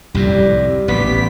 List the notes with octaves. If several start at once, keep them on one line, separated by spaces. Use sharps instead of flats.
C2 F2 A2 G3
A1 B3 G4 B6